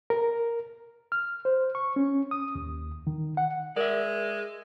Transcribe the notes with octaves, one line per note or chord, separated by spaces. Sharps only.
A#4
F6
C5
C#6
C#4
D#6
D#2
D#3
F#5
G#3 A#4 D5 E5